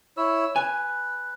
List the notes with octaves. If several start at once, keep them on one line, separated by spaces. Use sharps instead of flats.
E4 C#5 E6
B4 G#5